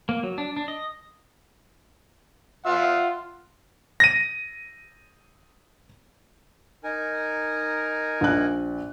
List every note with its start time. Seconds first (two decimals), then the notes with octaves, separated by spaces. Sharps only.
0.09 A#3
0.23 F#3
0.38 D4
0.56 D4
0.68 D#5
2.66 F4 E5 F#5
4.00 A#6 D#7
6.84 D#4 A#4 G#5
8.21 A#1 F#6